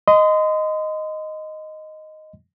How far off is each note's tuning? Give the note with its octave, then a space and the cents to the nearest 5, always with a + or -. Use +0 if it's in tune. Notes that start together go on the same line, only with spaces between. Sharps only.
D#5 +0 C6 -35